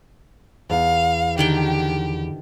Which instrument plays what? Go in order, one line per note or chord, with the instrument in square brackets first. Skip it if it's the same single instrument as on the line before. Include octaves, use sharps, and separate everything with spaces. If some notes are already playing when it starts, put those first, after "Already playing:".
[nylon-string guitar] E2 [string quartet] F5
[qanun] D3 D#3 G5 [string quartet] G4